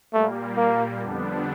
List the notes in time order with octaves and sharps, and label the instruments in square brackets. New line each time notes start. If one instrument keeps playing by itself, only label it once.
[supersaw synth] A#2 G3 A#3 [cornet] A3
[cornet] A#3
[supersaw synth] F2 D3 G3 B3 D4